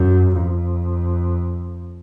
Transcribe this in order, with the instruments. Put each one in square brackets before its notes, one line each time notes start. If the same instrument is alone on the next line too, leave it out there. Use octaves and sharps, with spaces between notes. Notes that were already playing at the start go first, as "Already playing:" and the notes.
Already playing: [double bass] F#2
F2